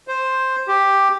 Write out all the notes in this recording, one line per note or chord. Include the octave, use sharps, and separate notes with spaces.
C5
G4